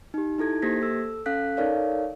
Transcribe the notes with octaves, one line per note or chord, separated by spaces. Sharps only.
D#4 G4
D#4 E4 A4 G#6
A#3 G4 C5 G#6 A#6 B6
A4 E6
C#4 A4 F5 F#6 B6
D#4 A4 A#4 C#5 D5 F5